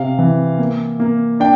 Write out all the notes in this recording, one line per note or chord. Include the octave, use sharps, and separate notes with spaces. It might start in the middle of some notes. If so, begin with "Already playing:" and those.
Already playing: C3 F5
E3
A#3
A#3
D4 G5